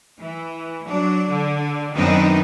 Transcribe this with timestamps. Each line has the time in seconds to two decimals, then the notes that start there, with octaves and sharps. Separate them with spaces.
0.19 E3
0.87 F#3 D4
1.30 D3
1.94 F#2 D#3 B3 C4 D4 D#4